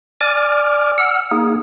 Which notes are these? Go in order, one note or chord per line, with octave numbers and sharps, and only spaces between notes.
D5 G#5 D6 F6
F#5 E6 F6
A#3 D#4 G#4